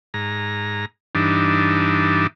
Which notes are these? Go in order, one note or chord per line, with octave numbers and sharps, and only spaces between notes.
G#2 A#5
G2 E3 D4 D#4